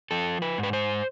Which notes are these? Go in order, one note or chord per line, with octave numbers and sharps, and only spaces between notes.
F3 A4
B4
G#2
B4
C5